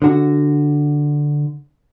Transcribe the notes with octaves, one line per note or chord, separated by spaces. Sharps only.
D3 F#4